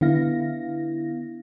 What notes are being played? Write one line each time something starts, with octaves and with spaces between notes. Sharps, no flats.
D3 B3 E4 F5 A#6